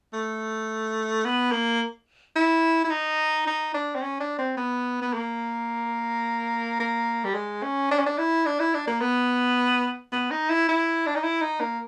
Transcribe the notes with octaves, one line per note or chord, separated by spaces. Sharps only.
A3
B3
A#3
E4
E4
D#4
D#4
D4
C4
C#4
D4
C4
B3
B3
A#3
A#3
G3
G#3
C#4
D4
C#4
D4
E4
D4
E4
D4
A#3
B3
B3
D#4
E4
E4
D4
D#4
E4
D#4
A#3